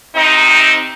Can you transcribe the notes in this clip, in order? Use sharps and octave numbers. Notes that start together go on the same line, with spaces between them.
C3 C4 D#4